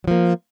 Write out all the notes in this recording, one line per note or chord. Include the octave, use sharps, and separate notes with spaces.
F3 F#3 A#3